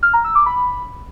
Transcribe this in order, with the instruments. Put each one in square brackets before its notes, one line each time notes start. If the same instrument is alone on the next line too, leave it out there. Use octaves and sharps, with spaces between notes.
[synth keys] F6
A#5
E6
D6
B5